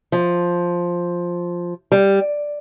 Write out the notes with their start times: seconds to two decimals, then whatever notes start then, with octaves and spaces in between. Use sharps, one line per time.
0.12 F3
1.92 G3